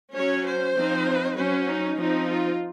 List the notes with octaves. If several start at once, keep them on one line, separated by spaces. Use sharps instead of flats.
F#3 C#4 C#5
C5
F3 C4 D#4
F#3 C#4 C5
D#4
F3 C4 D#4
F4